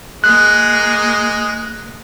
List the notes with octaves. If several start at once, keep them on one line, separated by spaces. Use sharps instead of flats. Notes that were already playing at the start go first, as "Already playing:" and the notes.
G#3 A#3 F#6